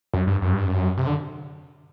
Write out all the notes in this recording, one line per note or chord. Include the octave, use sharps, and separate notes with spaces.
F#2
G2
F#2
G2
F#2
C3
D3